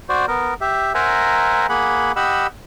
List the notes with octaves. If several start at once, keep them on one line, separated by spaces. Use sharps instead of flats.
F#4 C5 D5
B3 A#4
G4 E5
A#4 C5 E5 F#5 G#5 A#5
A#3 G#4 F#5 B5
G4 D#5 F#5 B5 E6